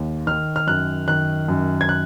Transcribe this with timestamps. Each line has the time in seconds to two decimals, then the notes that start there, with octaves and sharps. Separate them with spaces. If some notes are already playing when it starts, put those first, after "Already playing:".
Already playing: D#2
0.27 D#3 F6
0.56 F6
0.67 F#2 F#6
1.08 D#3 F#6
1.48 F#2
1.81 G#6
1.89 F#6